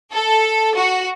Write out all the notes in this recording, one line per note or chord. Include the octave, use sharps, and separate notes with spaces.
A4
F#4